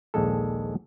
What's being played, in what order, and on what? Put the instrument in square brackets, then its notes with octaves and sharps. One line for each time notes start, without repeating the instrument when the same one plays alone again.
[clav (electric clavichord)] A#1 D#2 G#3 A4